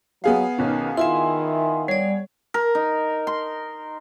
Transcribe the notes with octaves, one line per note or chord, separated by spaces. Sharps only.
F#3 B3 G#4 F5
B1 D#3 C#4
D#3 E4 F4 E5 G#5 C6
G3 C#5 D5
A#4
D#4
C6